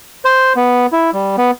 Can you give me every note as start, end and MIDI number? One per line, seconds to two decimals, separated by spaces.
0.25 0.53 72
0.56 0.86 59
0.92 1.11 64
1.13 1.36 55
1.38 1.51 59